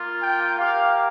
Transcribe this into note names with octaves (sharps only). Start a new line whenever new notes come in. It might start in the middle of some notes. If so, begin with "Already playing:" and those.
Already playing: A#3 F4
G5
A#3 G4 F5